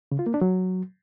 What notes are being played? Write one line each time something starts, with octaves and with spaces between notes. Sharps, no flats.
C#3
F4
A#3
D4
F#3